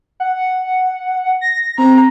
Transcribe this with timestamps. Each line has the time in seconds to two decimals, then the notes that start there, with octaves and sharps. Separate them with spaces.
0.20 F#5
1.41 A#6
1.78 C4 A#5